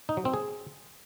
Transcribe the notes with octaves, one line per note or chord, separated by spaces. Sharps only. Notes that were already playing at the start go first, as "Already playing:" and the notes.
D#4
F#3
C4
G#4